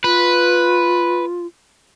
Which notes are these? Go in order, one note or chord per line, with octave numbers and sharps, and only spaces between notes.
F4 B4